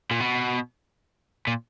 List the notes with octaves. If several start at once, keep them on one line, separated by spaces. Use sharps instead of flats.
A#2
B2
A#2